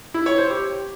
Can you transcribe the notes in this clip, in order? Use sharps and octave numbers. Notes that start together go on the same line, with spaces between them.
E4
C#5
C5
G4